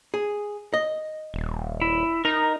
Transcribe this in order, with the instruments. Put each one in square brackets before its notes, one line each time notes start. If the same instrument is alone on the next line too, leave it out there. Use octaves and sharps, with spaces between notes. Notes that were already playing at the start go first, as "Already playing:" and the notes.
[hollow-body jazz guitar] G#4
D#5
[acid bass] D#1
[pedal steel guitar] E4
[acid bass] D#4 [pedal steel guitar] A#4 A#5